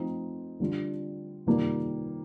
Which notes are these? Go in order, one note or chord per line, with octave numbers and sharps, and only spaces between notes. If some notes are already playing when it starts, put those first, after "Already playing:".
Already playing: F3 A3 C4 D#4
D3 G3 D4 F4
C3 D#3 G3 A#3 F4